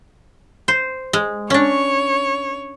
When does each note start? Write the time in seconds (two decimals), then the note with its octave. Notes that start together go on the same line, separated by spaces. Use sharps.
0.68 C5
1.13 G#3
1.50 C#4 D4 C#5